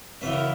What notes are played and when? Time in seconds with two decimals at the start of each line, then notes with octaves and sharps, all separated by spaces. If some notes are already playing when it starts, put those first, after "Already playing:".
0.21 F#2 C#3 E3 B4
0.32 A#4